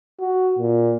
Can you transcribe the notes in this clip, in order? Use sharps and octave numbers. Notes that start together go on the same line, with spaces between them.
F#4
A#2